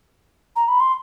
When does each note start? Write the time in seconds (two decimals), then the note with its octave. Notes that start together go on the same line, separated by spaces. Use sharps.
0.56 A#5
0.68 B5
0.80 C6